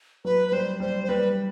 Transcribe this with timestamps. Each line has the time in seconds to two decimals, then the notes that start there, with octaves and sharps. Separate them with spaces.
0.25 F#3 B4
0.48 B4
0.52 G3 C5
0.80 G3 C5
1.04 C5
1.09 G3 B4